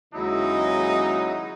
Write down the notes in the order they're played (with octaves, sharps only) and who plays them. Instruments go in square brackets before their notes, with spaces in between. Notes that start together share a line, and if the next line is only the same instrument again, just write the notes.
[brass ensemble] D#2 C#3 G#3 [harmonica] F#3 E4 [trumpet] D#4